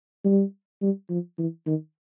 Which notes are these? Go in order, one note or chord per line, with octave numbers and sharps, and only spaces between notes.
G3
G3
F3
E3
D#3